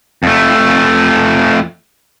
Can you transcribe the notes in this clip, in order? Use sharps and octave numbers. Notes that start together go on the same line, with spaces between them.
F2 A3